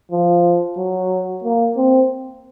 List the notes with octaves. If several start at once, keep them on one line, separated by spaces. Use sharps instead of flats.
F3
F#3
A#3
C4